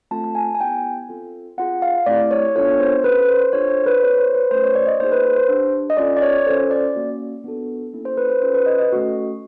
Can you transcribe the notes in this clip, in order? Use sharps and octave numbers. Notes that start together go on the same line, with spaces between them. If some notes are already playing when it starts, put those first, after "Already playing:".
A3 C4 F4 A4 A5
A5
G#5
G#5
B3 E4 G4 G5
C4 F4 A4
C4 F4 G#4 F#5
F5
A3 C4 E4 G4 D5
C#5
B3 D4 F4 A4 C#5
C5
C#4 F#4 A4 B4
C5
C5
D4 F4 A4 C#5
C5
B4
C4 F4 G#4 C#5
C5
B4
A3 C#4 F4 C5
C#5
D5
D#5
A#3 D#4 G#4 C5
B4
C5
C5
D4 G4
D#5
C#4 F4 A4 D5
D5
C#5
C#4 F4 A4 C5
D5
A#3 C#4 F#4
B3 D4 F#4 A4
A#3 C#4 E4 A4
C5
B4
C5
C#4 F4 A4 C5
B4
D#5
D#5
A3 C#4 F#4 A4